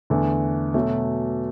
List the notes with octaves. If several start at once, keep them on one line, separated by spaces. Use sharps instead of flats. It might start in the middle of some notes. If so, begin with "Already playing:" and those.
E2 D3 A3
B2 F#3 A3